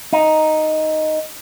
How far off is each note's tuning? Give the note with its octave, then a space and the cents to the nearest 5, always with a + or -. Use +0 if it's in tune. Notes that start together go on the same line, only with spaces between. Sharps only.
D#4 +0